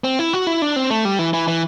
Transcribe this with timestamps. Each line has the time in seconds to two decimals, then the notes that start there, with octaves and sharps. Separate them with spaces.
0.04 C4
0.19 E4
0.33 F#4
0.47 E4
0.62 D4
0.76 C4
0.91 A3
1.05 G3
1.19 E3
1.33 E3
1.48 E3